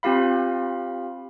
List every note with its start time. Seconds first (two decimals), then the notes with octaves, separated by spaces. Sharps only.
0.03 C4 F4 G4 F5 B5